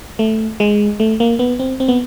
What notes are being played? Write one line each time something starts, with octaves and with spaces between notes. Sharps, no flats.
A3
G#3
A3
A#3
B3
C4
C4
B3